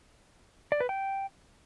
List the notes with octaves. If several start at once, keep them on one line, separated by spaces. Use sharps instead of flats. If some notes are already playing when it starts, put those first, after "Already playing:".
D5
B4
G5